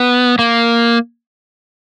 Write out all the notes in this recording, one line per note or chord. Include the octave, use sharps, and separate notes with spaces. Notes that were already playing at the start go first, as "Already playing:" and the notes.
Already playing: B3
A#3